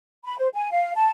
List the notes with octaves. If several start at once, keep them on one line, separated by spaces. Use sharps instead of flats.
B5
C5
G#5
F5
A5